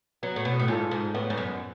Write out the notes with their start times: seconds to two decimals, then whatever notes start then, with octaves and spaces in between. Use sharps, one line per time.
0.23 F#3 B3
0.36 A2
0.45 B2
0.60 A2
0.68 G#2 F4 A4
0.91 G#2
1.15 A2 B3
1.30 G#2
1.38 F#2